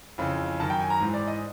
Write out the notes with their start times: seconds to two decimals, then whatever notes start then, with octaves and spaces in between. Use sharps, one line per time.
0.18 F2 C#3 E3
0.60 F#2 D#3 A5
0.70 G5
0.79 G#5
0.90 A#5
1.00 G#2 E3
1.13 D5
1.27 D#5